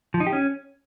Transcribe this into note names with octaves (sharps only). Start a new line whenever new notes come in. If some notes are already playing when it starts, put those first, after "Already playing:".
F3
D#4
G4
C#4